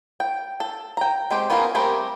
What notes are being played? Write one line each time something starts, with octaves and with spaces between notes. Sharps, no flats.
G5
A4
G5 A#5
G#3 C4 G4
B3 C#4 F4 G#4 A#4
G3 A3 C4 G4 A#4